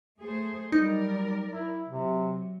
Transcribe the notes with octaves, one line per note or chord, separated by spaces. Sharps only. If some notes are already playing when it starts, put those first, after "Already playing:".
A3 G#4 C5
F#3 G3 D#4 A#4 D5
E4
C3 F#3